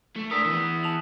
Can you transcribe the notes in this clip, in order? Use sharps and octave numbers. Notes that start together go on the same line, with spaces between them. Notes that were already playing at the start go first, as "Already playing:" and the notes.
A3
D4 A#4 D#6 E6 B6
E3 B3
A5 F7 F#7